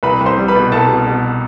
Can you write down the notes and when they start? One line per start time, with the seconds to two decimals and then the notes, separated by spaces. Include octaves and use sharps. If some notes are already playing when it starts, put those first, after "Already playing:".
0.03 C2 B4 B5
0.21 C2
0.26 C5 C6
0.38 G3
0.48 B4 B5
0.55 B2
0.72 C2 A4 A5
0.89 B2
1.07 B2